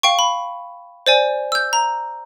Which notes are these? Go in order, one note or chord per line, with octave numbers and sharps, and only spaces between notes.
F5 G5 C#6
B5
C5 D5 G#5
E6 G6
A#5